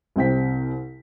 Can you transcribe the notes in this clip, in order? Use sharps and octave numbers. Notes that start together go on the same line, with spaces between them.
C2 C3 G5 B6